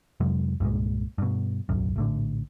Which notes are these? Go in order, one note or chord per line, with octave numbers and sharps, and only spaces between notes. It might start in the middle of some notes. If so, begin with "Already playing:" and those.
F2 C3 F#3 G#3
C2 G2 A#2 G#3
G2 B2
D1 B1 F#2
A#1 A2 D3